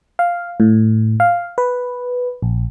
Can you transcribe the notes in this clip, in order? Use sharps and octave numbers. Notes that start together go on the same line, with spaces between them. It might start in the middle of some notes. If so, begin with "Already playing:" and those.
F5
A2
F5
B4
A#1